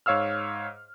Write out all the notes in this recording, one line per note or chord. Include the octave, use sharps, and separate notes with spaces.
G#2 C#5 F5 E6 F6